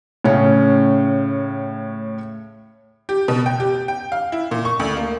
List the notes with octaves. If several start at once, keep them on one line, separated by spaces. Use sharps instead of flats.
A2 C#3 C#4
G4
B2
G5
G4
G5
F5
E4
A#2
C#6
D2
A#3